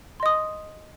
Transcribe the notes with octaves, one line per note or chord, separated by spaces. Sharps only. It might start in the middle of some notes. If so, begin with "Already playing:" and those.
D#5 C6 D#6